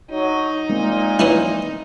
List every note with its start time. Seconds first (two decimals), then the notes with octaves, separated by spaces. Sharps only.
0.10 F#3 D#4
0.69 A#2 G#3 A#3 C4
1.19 E3 C#4 E4